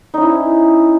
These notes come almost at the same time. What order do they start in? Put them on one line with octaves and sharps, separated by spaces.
D#4 C#4 E4